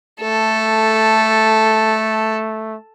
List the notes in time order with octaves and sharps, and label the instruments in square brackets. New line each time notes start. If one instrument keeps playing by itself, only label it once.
[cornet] A3 [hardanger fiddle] A4